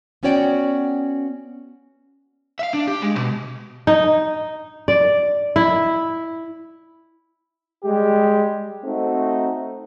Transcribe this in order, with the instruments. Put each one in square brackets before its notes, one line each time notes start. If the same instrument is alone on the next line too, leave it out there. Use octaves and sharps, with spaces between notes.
[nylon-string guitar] B3 C#4 F#4 C#5 D5 G5
[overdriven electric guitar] E5 F5
D4
G4
G#3
C2 B2
[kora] D#4
D5
E4
[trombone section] G3 G#3 G4
A3 C4 D#4 F#4